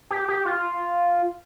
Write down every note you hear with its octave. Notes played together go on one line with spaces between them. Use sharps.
G4
G4
F4